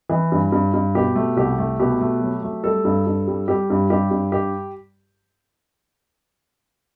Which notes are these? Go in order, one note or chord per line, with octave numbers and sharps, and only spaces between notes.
E3
G2
G2
G2
B2 G4
A3
C2 G4
A3
B2 G4
A3
F#3
A3
G3 A4
G2
G2
G3
G3 G4
G2
G2 G4
G2
G4